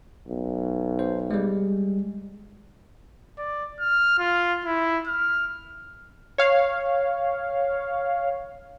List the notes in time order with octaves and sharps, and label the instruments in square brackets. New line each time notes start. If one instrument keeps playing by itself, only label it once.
[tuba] B1
[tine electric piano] C5
G3 G#3
[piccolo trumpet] D5
F6
F4
E4
F6
[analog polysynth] C#5 F5